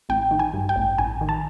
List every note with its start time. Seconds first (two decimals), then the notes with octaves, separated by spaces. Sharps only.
0.09 A1 G5
0.31 D#3
0.39 G#5
0.54 G2
0.69 G5
0.76 A1
0.98 A1 G#5
1.21 D#3
1.29 A5